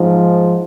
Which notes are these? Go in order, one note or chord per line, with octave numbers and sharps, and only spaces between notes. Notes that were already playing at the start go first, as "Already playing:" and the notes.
Already playing: G#2 F3